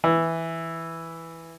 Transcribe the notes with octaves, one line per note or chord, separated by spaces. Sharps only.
E3